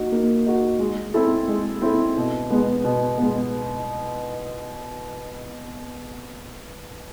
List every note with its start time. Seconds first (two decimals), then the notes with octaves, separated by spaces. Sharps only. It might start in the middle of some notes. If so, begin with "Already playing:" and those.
Already playing: A#3 D#4 F#4
0.12 A#3
0.46 D#4 F#4
0.79 G#3
1.14 C4 E4 A4
1.48 G#3
1.82 C4 E4 A4
2.17 B2
2.50 G#3 B3
2.84 B2
3.18 G#3 B3